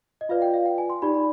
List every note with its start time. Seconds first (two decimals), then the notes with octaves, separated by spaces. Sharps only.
0.21 D#5
0.29 F4 B4 D5 F5
0.42 G5
0.54 F5
0.66 G5
0.78 G#5
0.90 C6
1.02 D#4 G4 D5 B5
1.14 B5